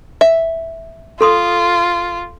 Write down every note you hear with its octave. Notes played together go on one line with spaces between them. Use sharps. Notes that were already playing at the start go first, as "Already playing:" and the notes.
E5
F4 A4 C6 D#6